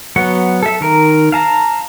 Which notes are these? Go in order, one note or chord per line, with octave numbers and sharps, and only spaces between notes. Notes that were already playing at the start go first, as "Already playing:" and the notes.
F#3 B3 F#5
A4 E5
D#3 A#4
F5 A5 A#5